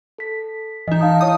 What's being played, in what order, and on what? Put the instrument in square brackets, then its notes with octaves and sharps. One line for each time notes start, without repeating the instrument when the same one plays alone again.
[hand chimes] A4 B6
[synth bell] E3 D#4 [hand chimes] D#5
[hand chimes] F5 A5 D#6
[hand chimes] E4 C#5 [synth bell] D#6